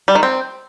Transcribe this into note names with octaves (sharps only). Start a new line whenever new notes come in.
G3
D#3
C4